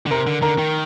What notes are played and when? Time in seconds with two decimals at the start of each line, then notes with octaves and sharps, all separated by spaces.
0.06 D3
0.11 C3 A#4 A#5
0.27 D3
0.42 D3 A#4 A#5
0.58 D#3